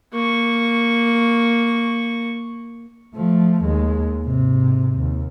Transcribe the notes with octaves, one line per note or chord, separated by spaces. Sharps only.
A#3 C#6
F3 A3
D#2 G#3
G#2 C3
D#2